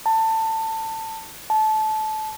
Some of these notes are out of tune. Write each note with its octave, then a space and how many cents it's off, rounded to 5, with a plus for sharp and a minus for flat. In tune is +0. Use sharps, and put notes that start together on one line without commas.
A5 +20
A5 -20